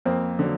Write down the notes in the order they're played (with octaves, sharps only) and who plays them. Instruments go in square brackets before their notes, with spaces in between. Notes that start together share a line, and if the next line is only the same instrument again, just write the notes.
[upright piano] F2 A#3 C4
D3 F#3